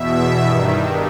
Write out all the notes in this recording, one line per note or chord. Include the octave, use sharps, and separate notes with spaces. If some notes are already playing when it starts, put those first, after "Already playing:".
Already playing: E2 B2 E5
G2 D#3